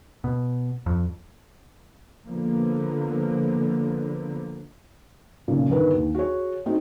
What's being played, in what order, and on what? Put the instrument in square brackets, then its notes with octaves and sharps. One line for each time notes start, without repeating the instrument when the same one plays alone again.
[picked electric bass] B2
F2
[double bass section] D3 F3 A#3 B3
[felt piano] B1 A#2 C#3
G1 D#3 B3 D#4 A#4 B4
D#2
F#4 G#4 C#5
A3 C4 D#4 F#4